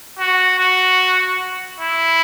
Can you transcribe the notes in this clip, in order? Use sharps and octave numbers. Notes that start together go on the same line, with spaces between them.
F#4
F#4
E4